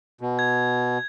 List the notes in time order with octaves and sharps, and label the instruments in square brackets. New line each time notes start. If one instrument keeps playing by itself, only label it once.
[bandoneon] B2
[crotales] G#6